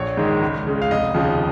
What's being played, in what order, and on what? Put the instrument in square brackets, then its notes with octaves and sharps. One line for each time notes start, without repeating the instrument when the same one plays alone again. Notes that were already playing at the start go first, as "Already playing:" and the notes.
Already playing: [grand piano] A#1 C#5
G#2 D#3 G#3
C#2
C#3 G#3
F5
F1 D#5
D#2 C#3 F3